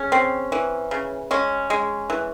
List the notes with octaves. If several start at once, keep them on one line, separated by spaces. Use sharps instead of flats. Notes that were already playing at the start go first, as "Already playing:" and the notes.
Already playing: C#3 C#4
C4
E3
C#3
G#3 C#4
G#3
E3